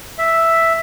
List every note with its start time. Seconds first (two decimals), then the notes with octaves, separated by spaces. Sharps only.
0.18 E5